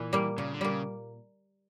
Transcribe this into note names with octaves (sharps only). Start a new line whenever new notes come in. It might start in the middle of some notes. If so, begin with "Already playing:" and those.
Already playing: A#2 E3
G3 A#3
A#2 C#3
D3
G3 A#3
C#3